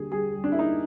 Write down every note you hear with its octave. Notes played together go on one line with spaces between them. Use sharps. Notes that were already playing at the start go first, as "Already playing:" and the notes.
Already playing: D#2 D3 G3 A#3 G#4
G3 G#4
G3
D4
A#3 E4
D#4